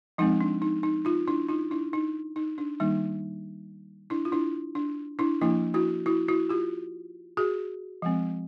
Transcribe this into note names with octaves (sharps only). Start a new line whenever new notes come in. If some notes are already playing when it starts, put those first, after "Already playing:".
F3 G#3 C4 D#4
D4
D#4
D#4
D#4 F4
D4 E4
D#4 F4
D4 E4
D#4
D#4
D4
D#3 G3 A#3 D#4
D4 E4
F4
D4 E4
D4
D4 E4
F3 A#3 D4 E4
E4 F#4
E4 F#4
E4 F#4
F4 G4
F#4 G#4
F3 G#3 C4